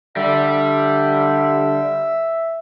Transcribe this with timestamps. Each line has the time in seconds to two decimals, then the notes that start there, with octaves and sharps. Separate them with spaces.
0.16 D3 G3 E5